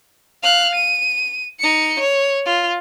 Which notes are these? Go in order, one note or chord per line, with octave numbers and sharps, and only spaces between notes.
F5 F#6
D#7
D#4 C#7
C#5
F4